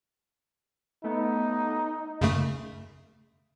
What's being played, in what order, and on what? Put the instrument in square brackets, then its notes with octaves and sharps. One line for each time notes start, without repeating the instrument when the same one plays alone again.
[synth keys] A3 B3 [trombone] D#4
[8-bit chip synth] F#2 C#3 A3